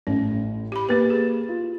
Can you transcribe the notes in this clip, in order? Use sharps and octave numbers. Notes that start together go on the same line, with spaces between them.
A1 A2 C#4
G4 B5
A#3 G4 B4 A6
G#4
F4